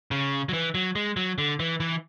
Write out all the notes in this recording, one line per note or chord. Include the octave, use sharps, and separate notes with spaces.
C#3
F#3
E3
F#3
G#3
F#3
D3
E3
E3